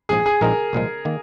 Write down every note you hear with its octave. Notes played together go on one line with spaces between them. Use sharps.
A#1 G#2 F3 G#4
G#4
A#1 A#2 G#3 C4 D#4 A#4
C2 A#2 F3 G#3
D#3 A#3